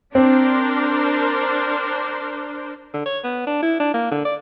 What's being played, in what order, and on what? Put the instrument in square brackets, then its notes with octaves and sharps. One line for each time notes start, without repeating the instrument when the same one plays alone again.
[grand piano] C4 [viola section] D4 A#4 C5
[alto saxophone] D3
C#5
B3
D4
E4
D4
A#3
D3
D5